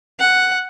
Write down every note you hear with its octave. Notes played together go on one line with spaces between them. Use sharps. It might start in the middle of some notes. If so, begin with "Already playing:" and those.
F#5